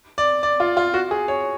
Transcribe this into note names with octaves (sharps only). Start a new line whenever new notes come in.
D5
D5
F4
F4
F#4
G#4
C#5